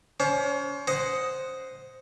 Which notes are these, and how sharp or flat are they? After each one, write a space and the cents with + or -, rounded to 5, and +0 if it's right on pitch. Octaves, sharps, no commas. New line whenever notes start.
C#4 +35 C5 +25
C5 +0 D#5 +5 F#5 +0